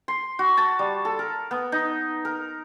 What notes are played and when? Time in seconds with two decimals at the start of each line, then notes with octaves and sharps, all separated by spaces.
0.08 C6
0.39 F#4
0.57 A5
0.79 G3
1.05 A4
1.19 A#4
1.51 B3
1.72 D#4
2.25 A#4